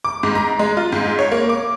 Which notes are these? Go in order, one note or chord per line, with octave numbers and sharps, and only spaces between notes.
D6
G#2
A#5
G#3
F4
G#2
C#5
A#3
D6